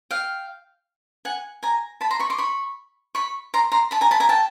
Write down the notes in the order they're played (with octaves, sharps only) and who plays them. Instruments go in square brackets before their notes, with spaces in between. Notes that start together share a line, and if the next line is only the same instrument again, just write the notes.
[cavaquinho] F5 G5
F#5 G#5
G#5 A#5
A5 B5
A#5 C6
B5 C#6
C6 D6
B5 C#6
B5 C#6
A#5 C6
A#5 C6
A5 B5
G#5 A#5
A5 B5
G#5 A#5
G5 A5